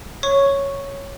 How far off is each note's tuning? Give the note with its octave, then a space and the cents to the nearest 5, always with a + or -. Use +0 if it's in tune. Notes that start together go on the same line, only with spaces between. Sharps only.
C#5 -5 C#6 +0